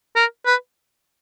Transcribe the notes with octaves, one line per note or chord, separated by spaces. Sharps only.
A#4
B4